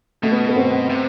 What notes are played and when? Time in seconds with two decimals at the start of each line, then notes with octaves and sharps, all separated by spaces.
0.23 B2 A3
0.32 B3
0.49 B3
0.56 C4
0.89 C3